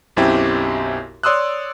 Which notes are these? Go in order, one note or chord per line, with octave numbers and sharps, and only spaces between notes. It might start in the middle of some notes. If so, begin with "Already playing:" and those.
B1 F#2 C4 E4 G4
C#5 D5 C6 D#6 E6 F#6